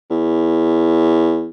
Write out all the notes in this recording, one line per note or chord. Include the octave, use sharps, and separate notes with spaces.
E2